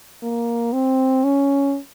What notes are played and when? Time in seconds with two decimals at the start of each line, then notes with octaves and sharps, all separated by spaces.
0.23 A#3
0.73 C4
1.24 C#4